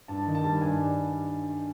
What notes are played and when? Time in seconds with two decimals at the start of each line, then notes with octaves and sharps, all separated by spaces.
0.08 G2 A5
0.26 D#3
0.35 A5
0.44 G3
0.61 G2 G#5